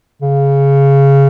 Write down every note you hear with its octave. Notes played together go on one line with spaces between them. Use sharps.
C#3